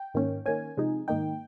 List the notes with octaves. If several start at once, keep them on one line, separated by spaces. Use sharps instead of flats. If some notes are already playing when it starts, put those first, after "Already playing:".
Already playing: G5
G#2 D#3 A#3 C#4
D#3 A#3 C#4 G#5
C3 F3 G#3 D#4
G#2 D#3 A#3 D#4 G5